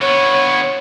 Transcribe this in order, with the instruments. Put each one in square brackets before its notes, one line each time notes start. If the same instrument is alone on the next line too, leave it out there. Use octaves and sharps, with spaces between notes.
[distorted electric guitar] D3 B3 [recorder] C#5